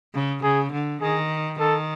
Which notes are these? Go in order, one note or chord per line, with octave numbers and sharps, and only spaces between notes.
C#3
C#3 G#4
D3
D#3 G#4
D#3 A4